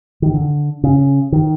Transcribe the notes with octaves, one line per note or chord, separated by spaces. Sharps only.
D#3
D3
C#3
D#3